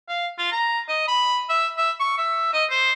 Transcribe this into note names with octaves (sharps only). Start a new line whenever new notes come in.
F5
F4
A#5
D#5
B5
E5
E5
C#6
E5
D#5
C5